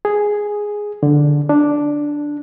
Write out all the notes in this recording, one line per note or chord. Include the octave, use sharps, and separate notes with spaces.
G#4
D3
D4